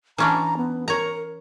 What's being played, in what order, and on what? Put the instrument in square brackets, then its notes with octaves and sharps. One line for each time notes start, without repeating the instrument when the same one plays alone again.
[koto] E3 C#4 D4 [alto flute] A#5
[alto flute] B3
[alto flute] A#4 [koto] C#5 A#5